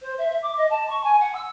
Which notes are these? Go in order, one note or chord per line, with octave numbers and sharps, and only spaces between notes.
C5
E5
E5
D6
D#5
A5
C#6
G#5
F#5
E6